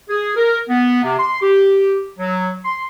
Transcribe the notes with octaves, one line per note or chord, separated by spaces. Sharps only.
G#4
A#4
B3
C3
C6
G4
F#3
C6